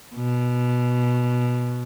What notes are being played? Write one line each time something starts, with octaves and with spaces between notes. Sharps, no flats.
B2